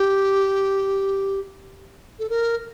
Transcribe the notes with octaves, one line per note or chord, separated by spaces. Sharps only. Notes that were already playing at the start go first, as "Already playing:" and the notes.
Already playing: G4
A4
A#4